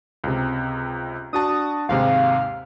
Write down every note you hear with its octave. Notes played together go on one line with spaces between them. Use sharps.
C#2 C3
D4 F#4 A5 D#6
D#2 G#2 C3 F5